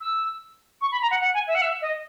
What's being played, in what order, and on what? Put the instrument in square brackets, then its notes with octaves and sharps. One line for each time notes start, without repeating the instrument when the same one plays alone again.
[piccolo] E6
C#6
B5
A#5
F#5
F#5
G#5
E5
F#5
E5
D#5